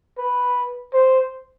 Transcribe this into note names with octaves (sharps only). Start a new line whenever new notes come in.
B4
C5